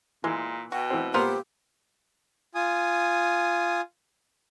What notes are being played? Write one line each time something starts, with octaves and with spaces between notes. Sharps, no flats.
A#2 E3 G#3
B2 F#4 G5
E3 C4
A#2 B3 F4 G4 A#4 C5
F4 G#5 D#6